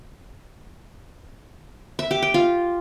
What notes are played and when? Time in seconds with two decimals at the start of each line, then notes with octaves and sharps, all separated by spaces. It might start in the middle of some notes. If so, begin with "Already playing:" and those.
1.99 E5
2.11 G4
2.22 G5
2.34 F4